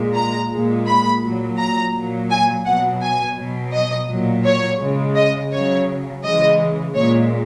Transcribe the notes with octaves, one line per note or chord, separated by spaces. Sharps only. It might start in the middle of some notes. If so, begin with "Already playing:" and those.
Already playing: A#2 G#3
A#5
A#2 G#3
B5
A#2 F#3
A#5
A#2 F#3
G#5
B2 F#3 F#5
G#5
B2 F#3
D#5
A#2 F#3
C#5
C#3 G#3
D#5
C#3 F#3 C#5
C#3 E3 G#3 D#5
A#2 G#3 C#5